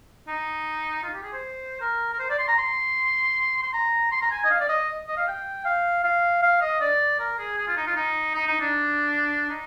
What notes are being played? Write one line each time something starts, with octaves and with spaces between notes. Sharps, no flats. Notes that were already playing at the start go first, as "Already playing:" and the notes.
D#4
F4
G4
G#4
C5
A#4
A#4
C5
D5
C6
A#5
C6
C6
A#5
C6
A#5
G#5
D#5
F5
D5
D#5
D#5
F5
G5
F5
F5
F5
D#5
D5
A#4
G#4
G#4
F4
D#4
F4
D#4
D#4
D#4
D4
D#4